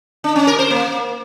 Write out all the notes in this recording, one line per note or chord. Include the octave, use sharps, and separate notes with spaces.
D4
C#4
A#4
C5
A#3